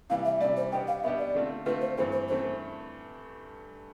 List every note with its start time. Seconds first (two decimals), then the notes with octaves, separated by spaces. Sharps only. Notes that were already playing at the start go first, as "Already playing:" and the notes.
0.10 C3 E3 G3 F5
0.25 E5
0.40 C3 E3 G3 D5
0.57 C5
0.71 B2 B3 D4 G4 G5
0.88 F5
1.03 B2 B3 D4 G4 E5
1.19 D5
1.34 D3 A3 C4 F4
1.66 D3 A3 C4 F4 B4
1.81 C5
1.98 G2 E3 A3 C4 C5
2.12 C5
2.28 E3 A3 C4 C5